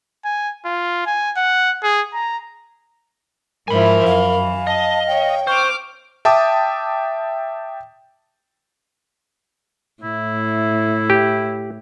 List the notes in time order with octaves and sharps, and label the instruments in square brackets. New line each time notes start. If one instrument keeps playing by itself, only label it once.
[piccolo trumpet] G#5
F4
G#5
F#5
G#4
A#5
[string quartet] G#2 F3 E4 [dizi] A#4 [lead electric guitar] G#5 B5
[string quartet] F#2 [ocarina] F5
[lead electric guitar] D#5 [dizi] A5
[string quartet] C#5 [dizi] G5
[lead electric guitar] C5 [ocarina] C#6 [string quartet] D6 F6
[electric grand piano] E5 G5 A5 D6 D#6
[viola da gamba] A2 [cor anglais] E4
[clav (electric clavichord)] G4